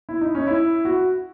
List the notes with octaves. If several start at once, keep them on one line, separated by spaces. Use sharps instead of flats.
E4
D#4
C#4
E4
F#4